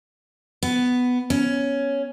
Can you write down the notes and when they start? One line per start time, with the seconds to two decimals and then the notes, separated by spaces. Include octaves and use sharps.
0.63 B3
1.30 C#4